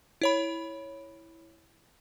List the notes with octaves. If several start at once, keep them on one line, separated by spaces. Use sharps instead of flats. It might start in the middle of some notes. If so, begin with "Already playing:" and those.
E4 C#5 B5